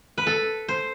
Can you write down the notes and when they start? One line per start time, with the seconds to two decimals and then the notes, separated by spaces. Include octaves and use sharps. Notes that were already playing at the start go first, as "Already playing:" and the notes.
0.18 B4
0.27 A4
0.68 C5